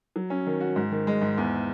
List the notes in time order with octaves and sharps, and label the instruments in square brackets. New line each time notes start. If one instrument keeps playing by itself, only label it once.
[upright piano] F#3
C#4
D#3
F#4
G#2
D#3
G#3
G#2
E2